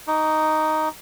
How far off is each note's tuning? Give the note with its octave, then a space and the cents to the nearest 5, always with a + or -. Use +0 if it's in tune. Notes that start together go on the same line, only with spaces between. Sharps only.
D#4 +0 D6 -40